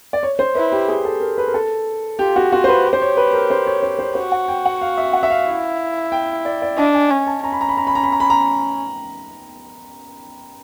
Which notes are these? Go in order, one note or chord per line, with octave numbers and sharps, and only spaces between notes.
D5
C#5
C5
E4 B4
G4
G#4
A4
A#4
B4
A#4
A4
F4 G4
F#4
F4 F#4
C5
B4
G4
C5
C#5
B4
A#4
C5
C#5
C5
C5
F#4 C5
F#5
G5
F#5
F5
E5
F#5
E5
F5
E4
G5
D5
D5
D4 D#5
G#5
C#4
A5
C#4 A#5
B5
A#5
B5
A#5
B5
A#5
B5
A#5
B5
A#5